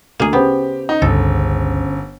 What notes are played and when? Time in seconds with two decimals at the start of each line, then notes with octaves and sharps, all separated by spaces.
0.20 D2 A#3 G#4
0.33 C#3 B3 G4 C5
0.89 D#4
1.02 G1 C#2 G2 A4